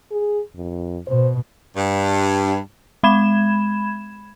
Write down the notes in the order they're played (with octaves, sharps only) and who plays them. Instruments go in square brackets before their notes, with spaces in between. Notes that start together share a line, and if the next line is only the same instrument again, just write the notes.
[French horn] G#4
F2
[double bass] B2 [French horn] C5
[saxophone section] G2
[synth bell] G#3 B5 G#6 E7